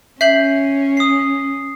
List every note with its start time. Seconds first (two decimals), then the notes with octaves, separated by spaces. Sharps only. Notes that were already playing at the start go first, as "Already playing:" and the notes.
0.21 C#4 E5 G6 C7 F#7
0.97 D#6 C7